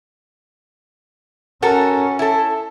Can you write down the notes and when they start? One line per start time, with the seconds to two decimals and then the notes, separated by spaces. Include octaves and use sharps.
1.62 C#4 F#4 A4 A#4
2.19 E4 A4